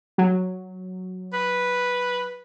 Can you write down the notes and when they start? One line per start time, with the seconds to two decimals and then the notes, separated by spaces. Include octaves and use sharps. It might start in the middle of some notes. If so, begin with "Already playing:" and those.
0.18 F#3
1.33 B4